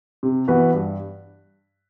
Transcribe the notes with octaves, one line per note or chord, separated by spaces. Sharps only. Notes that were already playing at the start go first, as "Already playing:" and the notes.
C3
E3 B3 F#4 B4
G2